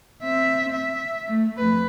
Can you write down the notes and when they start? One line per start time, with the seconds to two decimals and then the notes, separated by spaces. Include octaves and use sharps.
0.23 C4 E5
0.72 E5
1.27 A3
1.57 F2 B4